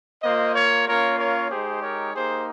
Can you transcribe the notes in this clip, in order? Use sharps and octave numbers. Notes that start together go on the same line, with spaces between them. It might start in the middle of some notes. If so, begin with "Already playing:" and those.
A#3 F4 C5 D#5
A#4 C#5
A#3 C#4 F4 A#4 C#5
A#4 C#5
G#3 D#4 G4 G#4 C5
A#4 C#5
A#3 D#4 G4 G#4 C5